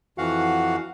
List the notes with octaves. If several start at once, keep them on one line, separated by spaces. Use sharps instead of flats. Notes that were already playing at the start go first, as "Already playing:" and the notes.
F2 E3 F#4 F5 F#5